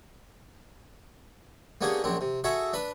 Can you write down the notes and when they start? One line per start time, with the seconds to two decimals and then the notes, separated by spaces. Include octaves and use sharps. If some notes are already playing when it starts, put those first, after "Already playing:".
1.81 A#3 B3 C#4 D4 G4 G#4
2.04 A#1 F#2 C4 D4
2.21 C3
2.44 F#4 G#4 A4 C#5 E5
2.73 D4 B4 B5